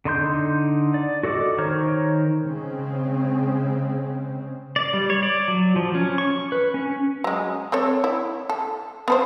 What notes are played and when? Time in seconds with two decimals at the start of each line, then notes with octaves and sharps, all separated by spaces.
0.05 D3 D#4 C6 G6
0.94 D5
1.23 F#4 A4 D5 D#5 D6
1.58 D#3 C5 C#5 A#5 F6
2.44 C#3 G#3 C4
4.76 D5
4.94 G3
5.10 C#5
5.23 D5
5.48 F#3
5.76 F3
5.95 C#4
6.18 C#6
6.30 C#6
6.52 B4
6.74 C#4
7.24 F#3 G#3
7.72 C4 A4 C#5
8.04 E4
8.50 A4
9.08 B3 A4 C5